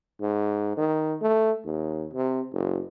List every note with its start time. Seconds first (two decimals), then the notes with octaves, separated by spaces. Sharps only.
0.21 G#2
0.77 D#3
1.21 A3
1.65 D#2
2.13 C3
2.52 F#1